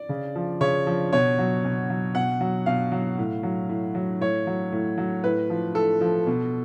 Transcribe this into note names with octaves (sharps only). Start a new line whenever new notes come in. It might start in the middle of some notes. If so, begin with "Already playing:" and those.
Already playing: D5
C#3
F3
C#3 C#5
F3
B2 C#5
F#3
B2
F#3
B2 F#5
F#3
B2 F5
F#3
A2
F#3
A2
F#3
A2 C#5
F#3
A2
F#3
A2 B4
F3
A2 A4
F3
B2